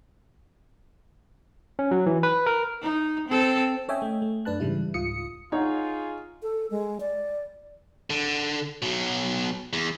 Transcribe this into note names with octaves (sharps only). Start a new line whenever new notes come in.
C#4
F#3
E3
B4
A#4
D#4
C4 A4
C#4 C#5 D#5 E5 G5 G#5
A3
A3
F#2 D4 B4 A5 F#6
G#2 C#3 E3 G3 E4
C#2 G#2 F4 D#6 C#7
D#4 F4 G#4 C#5 F#5
A4
G#3
D5
D3
B2 F#3
E2